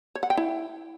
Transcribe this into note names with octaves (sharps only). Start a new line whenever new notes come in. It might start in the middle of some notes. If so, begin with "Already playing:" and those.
C#5
F#5
G5
E4